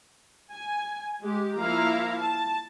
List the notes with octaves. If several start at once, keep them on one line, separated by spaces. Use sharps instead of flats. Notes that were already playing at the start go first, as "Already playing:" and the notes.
G#5
G#3 G4
F3 A#3 E4 F5 A#5
A5